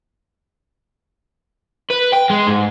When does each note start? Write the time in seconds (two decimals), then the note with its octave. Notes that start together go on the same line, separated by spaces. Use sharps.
1.91 B4
2.13 G5
2.31 G#3
2.48 G#2